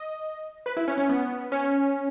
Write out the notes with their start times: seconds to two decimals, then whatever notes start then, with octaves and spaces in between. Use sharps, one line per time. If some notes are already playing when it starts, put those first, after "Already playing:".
Already playing: D#5
0.66 B4
0.77 E4
0.88 C#4
0.98 C#4
1.09 B3
1.52 C#4